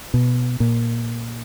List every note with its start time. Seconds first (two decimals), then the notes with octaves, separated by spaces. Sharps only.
0.14 B2
0.60 A#2